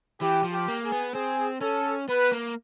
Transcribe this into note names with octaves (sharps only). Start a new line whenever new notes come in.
E3 G4
F3
G4
A#3
G#4
B3
C4 G#4
C#4 A4
B3 B4
A#3